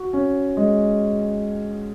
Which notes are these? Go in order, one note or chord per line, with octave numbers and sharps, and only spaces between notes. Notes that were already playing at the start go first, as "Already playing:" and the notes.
Already playing: F#4
C#4
G#3